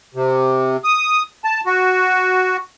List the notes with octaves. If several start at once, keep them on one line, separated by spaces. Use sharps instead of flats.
C3
D#6
A5
F#4